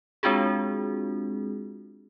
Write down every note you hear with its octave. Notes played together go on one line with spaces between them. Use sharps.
G#3 C4 D4 F4 F#4 G#4